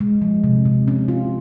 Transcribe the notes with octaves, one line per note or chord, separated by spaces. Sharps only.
G#3
F3
C3
C3
C#4
F4